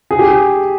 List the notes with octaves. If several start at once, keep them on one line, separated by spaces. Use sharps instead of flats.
G#4
G4
G#4